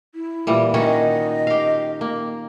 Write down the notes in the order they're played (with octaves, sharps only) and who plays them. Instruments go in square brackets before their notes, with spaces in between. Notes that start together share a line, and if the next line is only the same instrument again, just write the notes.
[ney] E4
[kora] A#2 E3 G3
[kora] D#3 C#4 F#4 [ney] D#5
[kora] G4 F5
A#3